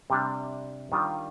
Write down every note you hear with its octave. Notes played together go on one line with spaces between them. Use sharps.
C3 G3 D4
D#3 G3 D4 F4